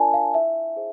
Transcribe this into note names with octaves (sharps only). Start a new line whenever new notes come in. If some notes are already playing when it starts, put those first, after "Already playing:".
Already playing: D4 F4 A#4 D5 G#5 A5
F5
E4 E5
G#4 C5